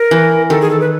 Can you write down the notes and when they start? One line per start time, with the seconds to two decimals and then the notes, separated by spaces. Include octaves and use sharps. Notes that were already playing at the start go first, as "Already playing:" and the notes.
Already playing: A#4
0.11 E3
0.50 D#3 A4
0.61 G#4
0.70 A4
0.81 B4